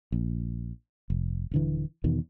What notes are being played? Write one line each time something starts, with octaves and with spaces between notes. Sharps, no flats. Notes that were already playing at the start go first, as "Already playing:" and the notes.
A#1
F1
D#1 D3 E3
E2 B2 D#3